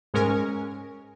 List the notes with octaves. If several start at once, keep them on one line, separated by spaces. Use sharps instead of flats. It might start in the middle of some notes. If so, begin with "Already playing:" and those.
G#2 G#3 C#4 A#4 G#5 C#6